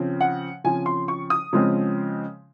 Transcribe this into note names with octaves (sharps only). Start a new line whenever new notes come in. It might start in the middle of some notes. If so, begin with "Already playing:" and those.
Already playing: C#3 F3 C4
F#5
C#3 F3 C4 G#5
C6
C#6
D#6
C#3 F3 G#3 C4